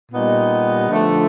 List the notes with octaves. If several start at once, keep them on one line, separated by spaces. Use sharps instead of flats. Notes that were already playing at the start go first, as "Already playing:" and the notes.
A#2 G3 B3 D#4
D3 F3 A3